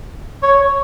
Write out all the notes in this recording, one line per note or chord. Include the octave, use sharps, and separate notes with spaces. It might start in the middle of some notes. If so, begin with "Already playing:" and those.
C#5